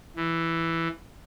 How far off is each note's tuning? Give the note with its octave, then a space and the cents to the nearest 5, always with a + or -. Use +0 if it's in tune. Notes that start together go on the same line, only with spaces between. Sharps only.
E3 +5